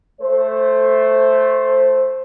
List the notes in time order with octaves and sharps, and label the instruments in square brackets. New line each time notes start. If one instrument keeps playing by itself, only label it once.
[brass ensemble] A3 C5